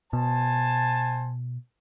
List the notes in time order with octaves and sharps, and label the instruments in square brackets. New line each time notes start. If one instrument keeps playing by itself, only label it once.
[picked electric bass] B2 [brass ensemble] C5 G#5 A5